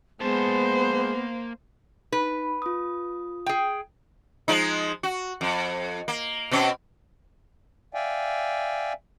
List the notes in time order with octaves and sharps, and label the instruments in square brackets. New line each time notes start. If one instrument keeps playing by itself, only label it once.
[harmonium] G#3 [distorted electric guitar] A#3 A5 [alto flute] B3 [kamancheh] C5
[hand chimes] D#4 [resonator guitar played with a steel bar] B4
[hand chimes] F4 D#6
[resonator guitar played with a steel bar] G#4 G5
[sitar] F3 G#3 D#4
F#4
F2
A#3
B2 C4 C#4
[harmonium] D5 E5 F5 G5 G#5